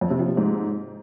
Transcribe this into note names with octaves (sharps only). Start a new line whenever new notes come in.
F2
C3
F3
C3
G#2